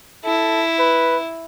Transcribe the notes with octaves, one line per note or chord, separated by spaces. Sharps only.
E4 A4
B4